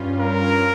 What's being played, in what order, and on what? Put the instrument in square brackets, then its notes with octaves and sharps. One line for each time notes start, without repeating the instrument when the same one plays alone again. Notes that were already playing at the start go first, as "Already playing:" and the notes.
Already playing: [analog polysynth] G2 G3 C#4 F4
[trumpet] A#4